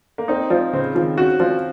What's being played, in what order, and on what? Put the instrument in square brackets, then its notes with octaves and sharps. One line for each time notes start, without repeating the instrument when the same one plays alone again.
[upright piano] A#3
[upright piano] C4 [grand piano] D#4
[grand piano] F3 [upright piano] C4
[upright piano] C#3 [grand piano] C4
[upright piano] D#3 [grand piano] F3
[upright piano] C#4 [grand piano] F#4
[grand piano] F3 [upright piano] C4